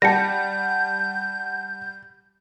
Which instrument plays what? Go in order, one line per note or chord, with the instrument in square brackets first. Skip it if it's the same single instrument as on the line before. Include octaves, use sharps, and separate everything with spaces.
[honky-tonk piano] G3 [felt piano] F#5 A5 [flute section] G6 [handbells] A#6 C#7